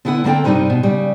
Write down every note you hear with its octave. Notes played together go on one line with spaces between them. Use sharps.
D3 B3 E4 B4 F#5
D3 A#3 C4 A4 G5
G2 C3 G3 D#4 B4 C5
B2
C#3 G3